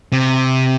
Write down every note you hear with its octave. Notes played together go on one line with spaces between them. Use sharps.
C3